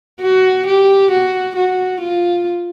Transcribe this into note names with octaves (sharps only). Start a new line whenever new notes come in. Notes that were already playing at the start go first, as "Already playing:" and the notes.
F#4
G4
F#4
F#4
F4